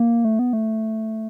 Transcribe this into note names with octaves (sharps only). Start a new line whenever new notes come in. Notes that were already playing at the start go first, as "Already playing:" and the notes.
Already playing: A#3
A3
B3
A3